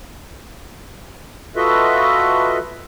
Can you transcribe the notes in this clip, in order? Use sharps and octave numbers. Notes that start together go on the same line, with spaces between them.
F4 F#4 A4 B4 D#5 E5